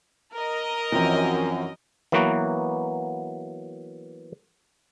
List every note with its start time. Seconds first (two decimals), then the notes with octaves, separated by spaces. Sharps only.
0.35 A#4 D#5
0.92 F#2 E3 F3 C4
2.12 E3 F#3 A#3 B3 F#4